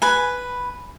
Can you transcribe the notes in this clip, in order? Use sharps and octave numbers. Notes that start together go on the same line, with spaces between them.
B4 G#5